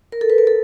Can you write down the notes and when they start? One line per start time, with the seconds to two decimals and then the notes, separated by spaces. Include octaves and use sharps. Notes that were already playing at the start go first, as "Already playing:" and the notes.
0.12 A#4
0.21 A4
0.30 B4
0.38 A#4
0.47 A4